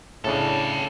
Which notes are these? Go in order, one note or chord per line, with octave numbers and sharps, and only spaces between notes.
A2 C#3 D4 G4 A4